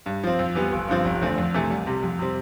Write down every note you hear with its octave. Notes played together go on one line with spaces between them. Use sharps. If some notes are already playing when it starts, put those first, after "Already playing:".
G2
F3 C4
F2
E3 G3 B3
G1
G2 D3 F3 C4
F1
E2 D3 A3 C4
F2
C3 E3 A3
C2
C3 G3
F2
C3 G3 C4